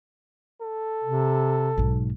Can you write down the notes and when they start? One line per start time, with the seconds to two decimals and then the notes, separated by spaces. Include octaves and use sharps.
0.61 A4
1.04 C3
1.78 B1 G#2